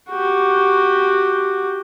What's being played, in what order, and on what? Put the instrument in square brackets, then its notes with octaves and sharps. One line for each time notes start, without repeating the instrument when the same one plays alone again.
[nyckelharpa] F#4 G4